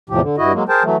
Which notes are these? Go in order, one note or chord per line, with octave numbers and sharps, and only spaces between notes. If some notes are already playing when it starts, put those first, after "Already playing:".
E2 A2 C3 F3 G4
D3
G2 E4 F#4 D#5
F#3 G#3 A#3
G#4 A#4 C5 G5 A5
E3 F#3 A3